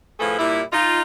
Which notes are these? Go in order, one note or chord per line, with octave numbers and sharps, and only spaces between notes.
A2 F3 A3 G#4 B4
A#2 G3 E4
D#4 F4